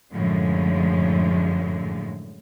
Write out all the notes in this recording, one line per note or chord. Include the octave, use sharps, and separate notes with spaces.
F#2 A2 D3 F3 G#3